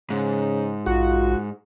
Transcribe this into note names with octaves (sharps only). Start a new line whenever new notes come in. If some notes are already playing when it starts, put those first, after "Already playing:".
G#2 C#3
A#1 F4 F#4